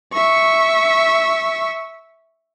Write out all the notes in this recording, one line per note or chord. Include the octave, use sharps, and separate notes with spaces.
E5 C#6